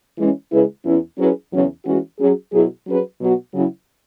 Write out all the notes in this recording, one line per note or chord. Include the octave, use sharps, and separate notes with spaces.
E3 G#3 C#4
C#3 G#3 E4 G#4 B4
E2 E3 C#4 E4
F#3 C#4 E4 G#4 B4
E2 C#3 F#3 C#4
E3 G#3 C#4 F#4
F#3 C#4 G#4
B2 F#3 E4 G#4
F#3 C#4 G#4 B4
B2 F#3 B3 F#4
C#3 F#3 C#4 E4